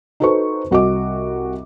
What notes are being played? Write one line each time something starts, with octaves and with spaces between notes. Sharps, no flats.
D#4 F#4 A4 B4 C5 C#6
C2 F#4 D#5 D6